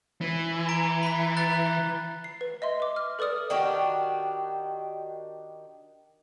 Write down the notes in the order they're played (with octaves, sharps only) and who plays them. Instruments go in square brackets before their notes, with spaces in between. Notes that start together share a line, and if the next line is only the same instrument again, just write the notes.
[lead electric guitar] E3
[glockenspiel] A#5 D7
B5 B6
A#5 F#6 A6
[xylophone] C7
B4
D#5 E5 C6
B4 D6
F6
A4 B4 D5 D#6 F6
[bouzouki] D#3 D4 F#4 G4